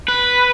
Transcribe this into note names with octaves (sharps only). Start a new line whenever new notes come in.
B4